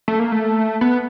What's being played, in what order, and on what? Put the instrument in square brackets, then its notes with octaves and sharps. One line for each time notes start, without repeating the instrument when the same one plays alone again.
[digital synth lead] A3
A#3
A3
B3